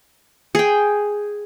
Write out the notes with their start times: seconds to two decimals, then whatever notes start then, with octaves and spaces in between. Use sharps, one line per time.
0.55 G#4 G5